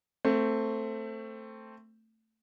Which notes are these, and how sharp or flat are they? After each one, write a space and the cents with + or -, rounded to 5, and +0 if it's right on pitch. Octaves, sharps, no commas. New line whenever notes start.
A3 +15 C4 +0